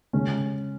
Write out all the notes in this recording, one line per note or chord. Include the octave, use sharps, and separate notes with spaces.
C#3 G#3 C#4